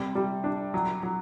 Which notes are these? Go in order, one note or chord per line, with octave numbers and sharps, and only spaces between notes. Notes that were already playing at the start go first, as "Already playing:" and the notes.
Already playing: C3 G3
G3
D4
F#3
F#3